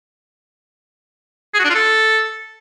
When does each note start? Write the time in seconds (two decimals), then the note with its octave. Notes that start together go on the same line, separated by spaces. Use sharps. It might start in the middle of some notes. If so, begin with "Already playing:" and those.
1.54 G#4
1.59 F#4
1.65 D4
1.70 F4
1.75 A4